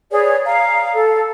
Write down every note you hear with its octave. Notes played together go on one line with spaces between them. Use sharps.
G#4 B4 C#5 D5
F5 A#5
A4